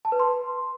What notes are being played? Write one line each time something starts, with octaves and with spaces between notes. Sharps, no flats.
A5
B4
C6